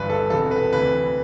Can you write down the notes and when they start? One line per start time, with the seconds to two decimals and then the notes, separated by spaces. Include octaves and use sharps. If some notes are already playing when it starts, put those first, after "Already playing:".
Already playing: G1 G2 E3 B4
0.10 A4
0.30 E1 E2 C3 A4
0.51 B4
0.73 D2 C3 E3 B4